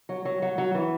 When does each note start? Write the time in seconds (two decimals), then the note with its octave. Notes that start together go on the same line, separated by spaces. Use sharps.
0.09 F#3
0.25 F#3
0.42 F#3
0.58 F#3
0.74 E3